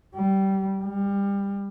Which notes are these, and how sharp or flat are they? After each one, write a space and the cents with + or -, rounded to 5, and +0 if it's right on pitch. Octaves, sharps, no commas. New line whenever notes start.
G3 -20
G3 +25